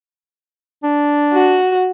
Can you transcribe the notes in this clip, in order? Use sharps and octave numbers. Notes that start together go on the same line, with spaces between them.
D4
F#4